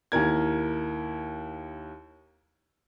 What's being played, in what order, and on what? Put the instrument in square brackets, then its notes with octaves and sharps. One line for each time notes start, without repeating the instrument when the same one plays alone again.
[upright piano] D#2 E4 A#4 G#6